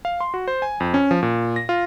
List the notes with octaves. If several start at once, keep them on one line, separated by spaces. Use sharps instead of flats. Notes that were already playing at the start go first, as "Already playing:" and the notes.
F5
C6
F#4
C5
G#5
F2
C#4
F3
A#2
A#6
F4